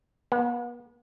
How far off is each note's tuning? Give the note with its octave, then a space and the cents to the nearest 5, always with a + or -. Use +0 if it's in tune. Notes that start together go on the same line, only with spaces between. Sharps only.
B3 -40